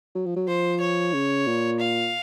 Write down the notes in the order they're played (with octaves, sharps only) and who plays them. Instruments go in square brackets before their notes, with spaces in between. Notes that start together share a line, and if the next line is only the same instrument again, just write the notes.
[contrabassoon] F#3
F3
F#3
[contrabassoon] F3 [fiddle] C5
[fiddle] C#5
[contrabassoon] C#3
A#2
[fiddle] F5